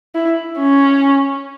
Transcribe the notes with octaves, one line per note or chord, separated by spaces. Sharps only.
E4
C#4